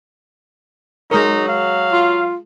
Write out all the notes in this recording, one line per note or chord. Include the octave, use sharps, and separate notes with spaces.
F#3 G#3 D#4 A#4
F5
F4